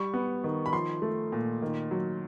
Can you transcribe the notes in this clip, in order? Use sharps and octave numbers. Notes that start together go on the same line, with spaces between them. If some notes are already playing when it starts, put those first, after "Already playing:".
Already playing: G3 C#6
B3
D#3
B5
F3 C6
A3
A#2
D#3
F#3